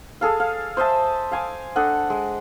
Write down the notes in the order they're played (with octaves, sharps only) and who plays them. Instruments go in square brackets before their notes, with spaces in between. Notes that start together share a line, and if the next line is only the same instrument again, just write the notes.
[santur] G#4 A4 F5
F5
C5 D#5 E5 A5
F5 G#5 D6
D4 A4 D#5 F#5
G#3